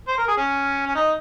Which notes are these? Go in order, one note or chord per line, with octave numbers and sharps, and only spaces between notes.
C5
A#4
G#4
C#4
C#4
D#4